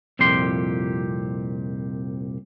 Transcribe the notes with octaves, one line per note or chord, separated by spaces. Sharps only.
C2 F2 A#2 G4 C6